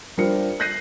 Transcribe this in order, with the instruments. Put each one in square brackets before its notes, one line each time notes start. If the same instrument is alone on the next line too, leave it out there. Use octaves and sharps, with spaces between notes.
[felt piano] G3 D4 F4 A#4 C5 C#7
F#6 G6 A#6 C7 D#7